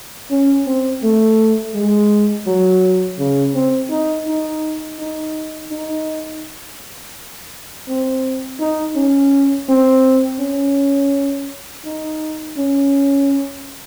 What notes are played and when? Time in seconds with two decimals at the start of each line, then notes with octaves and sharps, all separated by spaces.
0.31 C#4
0.66 C4
1.03 A3
1.74 G#3
2.47 F#3
3.19 C#3
3.54 C4
3.90 D#4
4.27 D#4
4.99 D#4
5.71 D#4
7.88 C4
8.60 D#4
8.96 C#4
9.69 C4
10.40 C#4
11.85 D#4
12.57 C#4